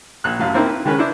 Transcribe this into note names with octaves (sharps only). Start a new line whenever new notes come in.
A#1 F#6
A1 F#2 F5
A#3 C4 D#4 E4
B4
D#3 G#3 C#4 A#4 B4
D4 E4 C5